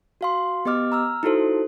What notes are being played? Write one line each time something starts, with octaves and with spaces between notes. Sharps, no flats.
F#4 F5 C6
B3 G4 D#5 D6 F6
A#5 E6 F6
D#4 E4 F#4 A4 C5